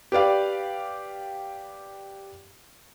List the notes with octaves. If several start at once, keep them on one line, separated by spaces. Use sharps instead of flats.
G4 B4 D5 F5